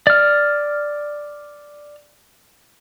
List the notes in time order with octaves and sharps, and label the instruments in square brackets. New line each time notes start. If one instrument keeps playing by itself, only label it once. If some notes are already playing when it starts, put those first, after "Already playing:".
[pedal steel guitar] D5 F6